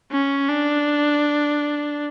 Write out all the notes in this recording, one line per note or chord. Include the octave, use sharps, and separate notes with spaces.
C#4
D4